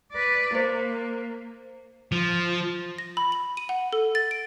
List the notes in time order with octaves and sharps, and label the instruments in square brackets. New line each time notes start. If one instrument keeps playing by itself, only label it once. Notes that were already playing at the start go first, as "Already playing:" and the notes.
[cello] B4 D5
[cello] A#3 [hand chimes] C5
[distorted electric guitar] F3
[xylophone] A#6
B5
F#7
D#7
F#5
A4
A6
D7